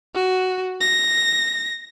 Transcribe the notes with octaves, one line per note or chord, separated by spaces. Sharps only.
F#4
A#6